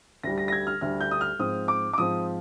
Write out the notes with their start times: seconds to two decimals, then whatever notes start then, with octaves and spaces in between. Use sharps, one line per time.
0.23 D2 D3 G3 A#6
0.38 A#6
0.48 A#6
0.53 G#6
0.67 F6
0.81 D2 D3 G3 F6
1.01 G6
1.11 D#6
1.21 F6
1.39 G#2 F3 C4 D#6
1.68 D6
1.93 D6
1.98 G#2 F3 C4 D#6